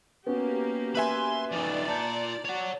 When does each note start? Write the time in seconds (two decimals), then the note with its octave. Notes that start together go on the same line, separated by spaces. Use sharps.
0.26 A#3 B3 C#4 F#4 G4
0.95 B4 E5 G#5 B5 C6
1.52 F3 D#4 D5
1.88 F4 A5 A#5 G6
2.45 C#5 F#5